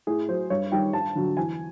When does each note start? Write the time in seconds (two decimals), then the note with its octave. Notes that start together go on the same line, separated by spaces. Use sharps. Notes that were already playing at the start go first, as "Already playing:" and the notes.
0.07 A2 G#4
0.28 F#3 C5
0.50 G2 C#5
0.72 D#3 G3 G5
0.93 G2 A5
1.15 D3 F#3
1.37 E2 G#5